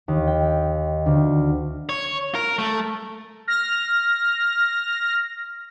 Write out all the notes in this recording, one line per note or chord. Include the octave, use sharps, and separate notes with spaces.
D#2
G5
D2
C#5
A#4
A3
F6 A#6